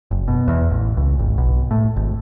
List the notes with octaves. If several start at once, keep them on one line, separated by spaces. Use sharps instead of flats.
F#1
B2
E2
A1
C#2
G#1
B1
A2
G#1